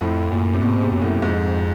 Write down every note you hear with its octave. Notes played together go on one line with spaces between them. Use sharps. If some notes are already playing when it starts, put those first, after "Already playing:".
F2 A2
F#2 A#2
C3
G#2 B2
C3
F#2
A2
F2 G#2